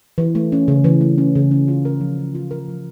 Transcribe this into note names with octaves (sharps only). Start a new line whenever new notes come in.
E3
A3
C#4
C#3
E3
A3
C#4
C#3
C#4
F4
A#4
F3
C#4
F4
A#4
F3